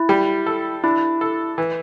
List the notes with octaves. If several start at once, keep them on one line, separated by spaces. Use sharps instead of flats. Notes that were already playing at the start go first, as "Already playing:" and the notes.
Already playing: E4
G3
A4
D4 E4
A4
E3